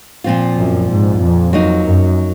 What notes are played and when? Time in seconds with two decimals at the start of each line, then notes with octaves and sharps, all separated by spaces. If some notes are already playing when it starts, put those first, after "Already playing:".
0.24 A#2 F3 C4 F4
0.57 F#2
0.89 G#2
1.20 F2
1.53 F#3 A#3 D#4
1.85 F#2